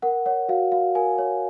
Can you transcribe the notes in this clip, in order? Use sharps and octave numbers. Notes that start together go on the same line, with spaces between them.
A#4 F#5
C#5 F#5
F#4 F5
F#4 F5
A#4 G#5
C#5